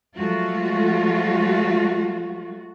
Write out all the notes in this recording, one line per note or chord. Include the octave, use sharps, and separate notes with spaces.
F3 F#3 G#3 A3 F4 F#4